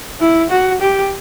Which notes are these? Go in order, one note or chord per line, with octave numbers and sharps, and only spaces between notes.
E4
F#4
G4